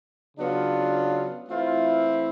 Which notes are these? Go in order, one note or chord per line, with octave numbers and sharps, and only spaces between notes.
C#3 F#3 B3 D4 F4
E3 A3 C4 E4 F4